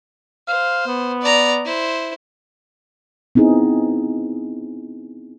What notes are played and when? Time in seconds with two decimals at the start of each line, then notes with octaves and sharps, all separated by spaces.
0.48 C5 F5
0.87 B3
1.22 D5 A#5
1.65 E4 C5
3.35 B3 C4 D#4 E4 G#4